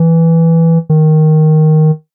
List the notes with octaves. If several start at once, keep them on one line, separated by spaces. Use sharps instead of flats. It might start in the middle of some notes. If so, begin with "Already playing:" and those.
Already playing: E3
D#3